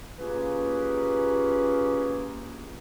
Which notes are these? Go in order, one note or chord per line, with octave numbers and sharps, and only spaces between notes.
A#3 C#4 F4 G4 G#4 B4